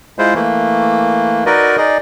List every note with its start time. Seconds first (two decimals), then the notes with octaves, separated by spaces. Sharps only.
0.19 G#3 E4 F4 C5
0.34 E3 A3 A#3
1.46 D#4 F#4 A#4 B4 D5 D#5
1.77 D#4 G#4 D5 D#5